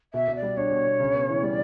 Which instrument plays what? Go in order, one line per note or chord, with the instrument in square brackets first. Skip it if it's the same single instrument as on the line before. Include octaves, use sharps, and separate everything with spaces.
[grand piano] B2 [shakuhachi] E5
[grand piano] B2
[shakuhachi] D5
[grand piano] G3
[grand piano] D4 [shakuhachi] C#5
[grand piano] B2
B2
C#3
B3
E3
[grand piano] G3 [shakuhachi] D5